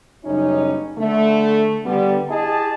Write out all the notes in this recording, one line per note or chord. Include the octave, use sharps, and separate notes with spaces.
F#1 G3 C#4 D#4
D3 A3
D3 G3 B3
E4 G4 G#4 D#5 A5